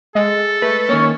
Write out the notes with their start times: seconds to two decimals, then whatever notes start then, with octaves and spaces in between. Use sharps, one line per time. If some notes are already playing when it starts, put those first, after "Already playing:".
0.15 G#3 A4
0.62 A3 B4
0.89 D#3 A#3 C#4